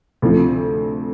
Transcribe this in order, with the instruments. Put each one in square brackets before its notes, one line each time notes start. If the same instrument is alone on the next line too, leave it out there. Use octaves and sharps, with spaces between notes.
[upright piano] D2 C3 F3